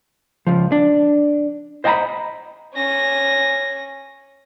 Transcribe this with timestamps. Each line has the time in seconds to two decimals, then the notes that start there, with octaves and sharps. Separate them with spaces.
0.47 C#2 F3
0.72 D4
1.84 C5 D#5 F#5 G#5 A#5 B5
2.75 C#4 A#6